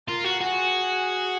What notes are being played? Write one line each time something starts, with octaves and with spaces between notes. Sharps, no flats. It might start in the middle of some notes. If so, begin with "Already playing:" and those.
F4 A#4
F#4
F#4 G#4